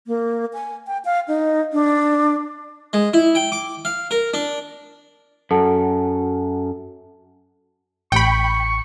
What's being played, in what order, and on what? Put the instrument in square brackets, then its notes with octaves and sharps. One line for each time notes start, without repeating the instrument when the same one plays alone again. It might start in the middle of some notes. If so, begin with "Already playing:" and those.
[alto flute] A#3
G#5
G5
F5
D#4
D4
[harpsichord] G#3
E4
G5
D6
F5
A#4
D4
[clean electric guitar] F#2 [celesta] A4 F#5 A5
[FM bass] A1 [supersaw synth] G5 B5 [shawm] C#6